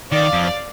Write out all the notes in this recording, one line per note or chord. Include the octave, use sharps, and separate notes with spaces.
D#3 D5 F5
F2